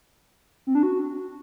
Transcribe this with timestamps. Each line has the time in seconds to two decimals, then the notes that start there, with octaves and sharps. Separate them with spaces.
0.67 C4
0.75 D4
0.83 F#4